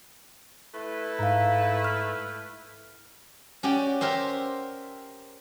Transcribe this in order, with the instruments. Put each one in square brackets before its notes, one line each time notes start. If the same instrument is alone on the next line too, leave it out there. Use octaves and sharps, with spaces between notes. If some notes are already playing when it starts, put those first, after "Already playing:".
[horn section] A3 E4 B4
[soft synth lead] G#2 [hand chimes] F5 A#5
[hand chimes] F6
[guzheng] C#4 F#4 G4 D5
G4 A#4 C5 E5